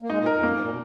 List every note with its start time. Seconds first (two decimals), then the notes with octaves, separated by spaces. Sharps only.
0.02 A#3
0.10 G#3 D#4
0.18 A#2
0.26 A#4
0.35 F2
0.43 F#2 A#3
0.52 G#2
0.61 A#2
0.69 B2